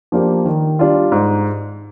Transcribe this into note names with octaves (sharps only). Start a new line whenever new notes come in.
F3 A#3 D4 G4
D#3
G3 D4 F4
G#2